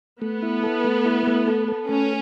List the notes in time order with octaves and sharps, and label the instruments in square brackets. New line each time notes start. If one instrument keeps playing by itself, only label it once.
[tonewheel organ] A3 [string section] B3
[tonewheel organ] E4
A4
A3
E4
A3
A4
A4
[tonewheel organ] A3 [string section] C#4